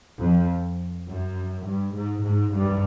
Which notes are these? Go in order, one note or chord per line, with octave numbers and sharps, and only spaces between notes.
F2
F#2
G2
G#2
G#2
G2